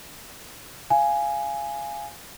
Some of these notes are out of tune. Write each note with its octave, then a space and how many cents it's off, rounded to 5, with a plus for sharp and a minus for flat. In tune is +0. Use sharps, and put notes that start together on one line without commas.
F5 -15 G#5 +0